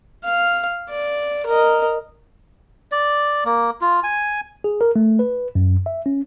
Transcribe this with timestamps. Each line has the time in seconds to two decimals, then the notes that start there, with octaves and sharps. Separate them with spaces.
0.24 F5
0.90 D5
1.46 A#4 D#5
2.92 D5
3.45 A#3
3.81 F4
4.03 G#5
4.64 G#4
4.81 A#4
4.96 A3
5.19 B4
5.55 F#2
5.86 E5
6.06 C#4